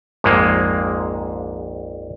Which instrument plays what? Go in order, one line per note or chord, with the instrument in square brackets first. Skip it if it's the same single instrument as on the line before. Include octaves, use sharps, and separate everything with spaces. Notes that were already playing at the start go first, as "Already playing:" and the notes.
[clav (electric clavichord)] A#1 F2 G#2 G#3 A#3